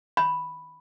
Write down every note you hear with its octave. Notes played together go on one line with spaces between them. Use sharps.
B5